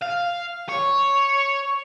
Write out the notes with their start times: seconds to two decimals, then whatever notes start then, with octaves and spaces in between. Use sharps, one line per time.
0.02 F5
0.69 C#5